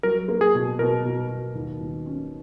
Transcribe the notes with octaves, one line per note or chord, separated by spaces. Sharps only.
F#3 A#4
A#3
G#4
B2
B2 A#4
B2
B2
D#2
D#2
C#4